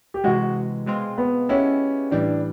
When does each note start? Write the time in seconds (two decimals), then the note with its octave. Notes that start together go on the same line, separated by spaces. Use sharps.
0.14 G4
0.24 C3 E3 G#3 F#4
0.86 B2 G#3 C4 F4
1.18 B3
1.49 G#3 B3 C#4 E4 G4
2.11 A2 E3 G3 D4